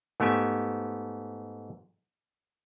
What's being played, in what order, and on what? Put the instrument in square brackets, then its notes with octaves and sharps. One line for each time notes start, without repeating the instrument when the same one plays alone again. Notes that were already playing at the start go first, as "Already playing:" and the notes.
[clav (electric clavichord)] G#2 A3 B3 G4 E5 G#5